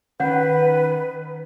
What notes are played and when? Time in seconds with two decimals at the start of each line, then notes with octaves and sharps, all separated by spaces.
0.20 D#3 C#4 B4 C#5 F#5